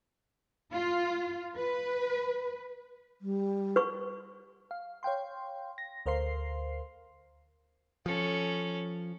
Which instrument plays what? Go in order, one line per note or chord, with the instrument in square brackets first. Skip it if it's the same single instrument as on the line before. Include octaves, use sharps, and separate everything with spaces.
[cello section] F4
B4
[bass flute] G3
[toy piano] B4 C#6
[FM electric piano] F5
C#5 F5 G5 C6
A#6
D2 A#4 C5 F5 C6 C7
[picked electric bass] F3 [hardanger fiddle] C#4 A4